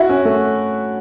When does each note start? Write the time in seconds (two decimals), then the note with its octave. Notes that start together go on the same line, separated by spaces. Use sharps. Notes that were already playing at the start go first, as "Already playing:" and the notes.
Already playing: E4 F#4
0.09 C#4
0.25 A3